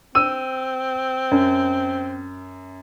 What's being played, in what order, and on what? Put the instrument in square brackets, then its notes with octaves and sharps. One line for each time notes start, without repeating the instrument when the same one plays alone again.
[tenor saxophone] C4 [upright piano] E6 D#7
[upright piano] F#2